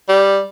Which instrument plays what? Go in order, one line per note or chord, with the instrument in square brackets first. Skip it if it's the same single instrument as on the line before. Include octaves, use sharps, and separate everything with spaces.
[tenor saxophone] G3